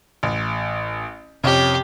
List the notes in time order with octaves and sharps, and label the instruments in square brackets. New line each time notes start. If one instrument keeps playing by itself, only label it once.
[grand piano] A1
[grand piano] F2 C#4 [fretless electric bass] C3 [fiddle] G4